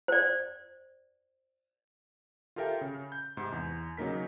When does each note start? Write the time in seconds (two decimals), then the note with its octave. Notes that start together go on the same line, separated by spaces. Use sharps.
0.08 C5 D5
2.56 F4 G4 A4 A#4 E5 G5
2.81 C#3
3.12 G6
3.37 G#2 C3
3.52 E2
3.97 C#3 F#3 A#3 D#4 A#4 B6